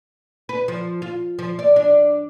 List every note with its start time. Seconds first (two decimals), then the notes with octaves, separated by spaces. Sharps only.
0.49 B4
0.68 F3
1.02 F4
1.39 F3
1.59 D5
1.76 D4